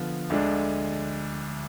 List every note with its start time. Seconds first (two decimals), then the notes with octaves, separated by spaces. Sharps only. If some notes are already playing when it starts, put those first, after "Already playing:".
Already playing: D3 F3 B3 F4
0.30 D2 D3 G#3 D4